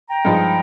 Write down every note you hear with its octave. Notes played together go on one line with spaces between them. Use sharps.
G5 A#5
G2 F3 G#3 D#4